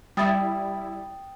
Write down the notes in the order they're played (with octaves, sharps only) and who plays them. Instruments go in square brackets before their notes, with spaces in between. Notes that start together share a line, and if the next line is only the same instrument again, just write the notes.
[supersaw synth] G3 E4 [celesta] G5 D#6 A6